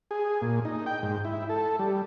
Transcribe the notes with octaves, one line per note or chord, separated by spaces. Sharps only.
G#4
A#2
D#4
G5
G#2
E4
A4
G3